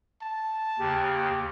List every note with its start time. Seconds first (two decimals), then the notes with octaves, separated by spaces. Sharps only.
0.22 A5
0.79 D#2 C#3 G4